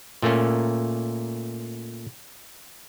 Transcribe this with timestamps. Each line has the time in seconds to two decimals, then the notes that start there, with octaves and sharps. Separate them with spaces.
0.22 A#2 A3 A#3 C#4